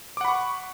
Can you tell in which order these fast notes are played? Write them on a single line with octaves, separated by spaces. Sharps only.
D6 F#5 B5 C#6